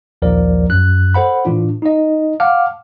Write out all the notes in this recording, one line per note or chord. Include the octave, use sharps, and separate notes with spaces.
A#1 D#2 F3 A#4 D5
F#2 F#6
A4 C5 F#5 B5
A2 E3 D4 F4
D#4 D#5
F5 F#5 A5 D6 F6